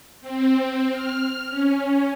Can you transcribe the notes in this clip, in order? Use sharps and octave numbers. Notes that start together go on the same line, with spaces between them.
C4
F6
C#4